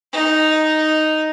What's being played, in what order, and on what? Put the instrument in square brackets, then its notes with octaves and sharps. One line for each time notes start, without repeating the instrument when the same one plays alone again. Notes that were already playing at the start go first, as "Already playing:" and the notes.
[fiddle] D#4